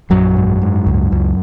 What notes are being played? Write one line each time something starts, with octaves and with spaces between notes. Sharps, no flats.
A#1 F#2 F#3
G#2
G#2
C#2
C#2